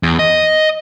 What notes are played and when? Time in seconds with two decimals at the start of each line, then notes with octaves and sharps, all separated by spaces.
0.03 E2
0.19 D#5